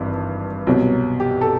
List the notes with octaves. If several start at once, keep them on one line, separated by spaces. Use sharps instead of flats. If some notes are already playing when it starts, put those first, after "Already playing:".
Already playing: G#1 G2 E3 E4
C2 B2 F#3
G4
A4